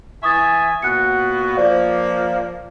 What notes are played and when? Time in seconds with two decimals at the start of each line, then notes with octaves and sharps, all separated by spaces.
0.23 E3 E5 G#5 C#6 D#6 A6
0.82 A#2 B3 F#4 F#6 C#7
1.57 F3 A#3 C5 D5 F5